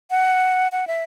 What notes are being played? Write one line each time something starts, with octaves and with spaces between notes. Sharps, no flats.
F#5
F#5
E5